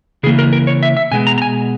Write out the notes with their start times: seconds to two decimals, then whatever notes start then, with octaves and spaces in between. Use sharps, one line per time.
0.23 C#3 E3 A#3 G#4
0.39 A#4
0.53 A#4
0.67 C#5
0.83 E5
0.97 E5
1.11 B2 G#3 B3 G#5
1.27 A#5
1.38 A#5
1.42 G#5